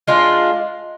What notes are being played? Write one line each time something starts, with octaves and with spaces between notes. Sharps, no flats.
G#3 D4 F4